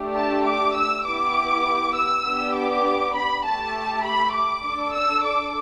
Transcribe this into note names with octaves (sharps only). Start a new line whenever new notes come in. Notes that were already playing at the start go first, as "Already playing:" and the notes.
Already playing: A3 D4 G4
A5
D6
E6
B3 E4 G4 D6
E6
B3 D4 G4
D6
B5
A3 G4 A5
B5
D6
D4 A4
E6
D6